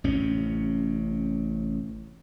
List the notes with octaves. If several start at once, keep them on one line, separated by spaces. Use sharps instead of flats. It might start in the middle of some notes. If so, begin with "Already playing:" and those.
A1 A2 C3 C#4